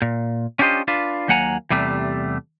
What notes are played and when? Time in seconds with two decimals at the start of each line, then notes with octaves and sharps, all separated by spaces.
0.02 A#2
0.59 C#4 D4 F4 G4 C5 D#5
0.88 D4 F4 B4
1.28 D#2 F#3 A#3 F#5 G#5 A#5
1.70 E2 C3 G3 A3